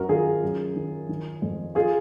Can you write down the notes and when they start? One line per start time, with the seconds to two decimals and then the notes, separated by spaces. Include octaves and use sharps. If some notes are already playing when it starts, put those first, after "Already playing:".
Already playing: F#2 F#4 A#4
0.09 D#3 F4 G#4
0.43 F#2
0.76 D#3
1.09 D#3
1.42 F2
1.75 F4 G#4